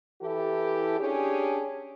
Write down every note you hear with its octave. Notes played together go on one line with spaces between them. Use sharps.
E3 E4 G4 A4
C#4 D4 G4 G#4